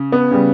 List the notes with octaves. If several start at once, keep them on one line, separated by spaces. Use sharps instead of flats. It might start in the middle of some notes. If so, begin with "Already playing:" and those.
Already playing: C#3
B3
C#3 G3